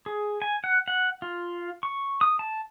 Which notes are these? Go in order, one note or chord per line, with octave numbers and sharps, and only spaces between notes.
G#4
G#5
F#5
F#5
F4
C#6
D#6
A5